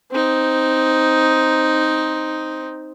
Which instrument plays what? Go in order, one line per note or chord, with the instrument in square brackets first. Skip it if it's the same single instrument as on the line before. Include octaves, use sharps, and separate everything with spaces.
[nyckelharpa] C4 D#4